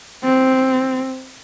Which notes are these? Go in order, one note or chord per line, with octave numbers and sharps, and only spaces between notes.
C4